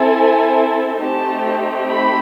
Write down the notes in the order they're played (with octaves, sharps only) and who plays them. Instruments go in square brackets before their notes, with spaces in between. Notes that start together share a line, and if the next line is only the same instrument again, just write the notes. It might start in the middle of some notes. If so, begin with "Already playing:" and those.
Already playing: [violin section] C4 E4 A4 G#5
A3 C4 D#4 G4 A5
B5